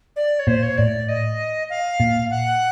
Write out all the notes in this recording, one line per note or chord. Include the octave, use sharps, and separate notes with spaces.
D5
C#5
A#2 C5
C#5
A2 D5
D#5
F5
A#2
F#5